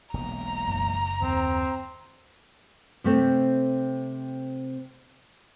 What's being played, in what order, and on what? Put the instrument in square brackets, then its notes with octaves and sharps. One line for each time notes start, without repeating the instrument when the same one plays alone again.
[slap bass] E1 B1 A#3 [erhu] A#5
[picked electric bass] F#1
[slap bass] D#2 [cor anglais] C4
[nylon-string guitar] C3 A3 C4